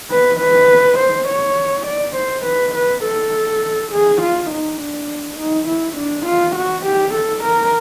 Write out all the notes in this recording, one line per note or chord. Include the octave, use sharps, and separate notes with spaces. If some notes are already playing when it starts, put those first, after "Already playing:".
B4
B4
C5
C#5
D5
C5
B4
B4
A4
G#4
F4
D#4
D4
D#4
E4
D4
F4
F#4
G4
A4
A#4